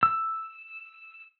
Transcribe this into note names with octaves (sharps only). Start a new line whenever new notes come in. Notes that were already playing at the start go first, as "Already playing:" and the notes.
E6